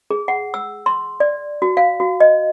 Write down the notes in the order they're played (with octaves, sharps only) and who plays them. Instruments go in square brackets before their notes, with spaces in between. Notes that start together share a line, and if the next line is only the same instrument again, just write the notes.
[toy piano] G#4
F#5
E6
C6
D5
F#4
F5
F#4
D#5